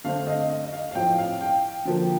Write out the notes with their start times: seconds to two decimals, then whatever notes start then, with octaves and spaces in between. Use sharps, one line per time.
0.04 D3 A3 C4 F5
0.27 D#5
0.50 D#5
0.64 D#5
0.73 F5
0.91 F5
0.94 A2 F3 C4 G5
1.18 F5
1.41 G5
1.85 D3 F3 A#3